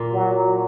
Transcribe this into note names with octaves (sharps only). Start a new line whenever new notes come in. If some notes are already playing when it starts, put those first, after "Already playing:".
Already playing: A#2
F#3